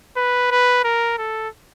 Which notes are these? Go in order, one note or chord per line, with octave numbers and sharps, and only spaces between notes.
B4
B4
A#4
A4